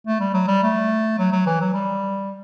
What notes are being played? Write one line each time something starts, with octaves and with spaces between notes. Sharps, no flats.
A3
G3
F#3
G3
A3
F#3
F#3
E3
F#3
G3